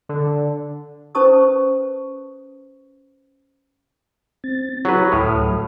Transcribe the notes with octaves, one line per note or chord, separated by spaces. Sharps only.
D3
C#4 B4 C5 A5 C#6 D#6
C4 A6
F#3 E4 G4 G#4 B4
D2 A2 D#6 F6
F#3